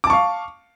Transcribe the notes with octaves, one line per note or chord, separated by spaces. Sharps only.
F5 A5 C#6 D6